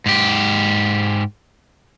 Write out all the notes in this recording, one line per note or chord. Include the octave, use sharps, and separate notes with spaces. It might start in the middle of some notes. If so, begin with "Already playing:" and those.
G#2 G4